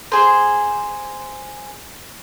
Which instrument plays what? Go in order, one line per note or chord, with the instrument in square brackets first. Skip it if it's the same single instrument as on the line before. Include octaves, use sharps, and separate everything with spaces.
[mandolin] G#4 C5